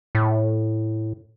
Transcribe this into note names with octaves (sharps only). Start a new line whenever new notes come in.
A2